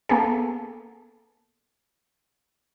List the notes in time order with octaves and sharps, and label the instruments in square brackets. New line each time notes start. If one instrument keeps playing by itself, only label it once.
[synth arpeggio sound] A#3 B3 G#4 A4